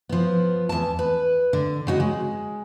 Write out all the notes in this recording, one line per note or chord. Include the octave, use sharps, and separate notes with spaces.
F3 B3
E2 A5
B4
D3
C#3 F#4 D#5
G#3